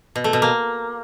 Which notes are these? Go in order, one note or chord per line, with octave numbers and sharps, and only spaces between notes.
B2
A3
B2
A#3